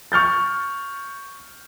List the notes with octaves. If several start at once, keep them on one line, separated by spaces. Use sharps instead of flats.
C#6 F6 G6 A6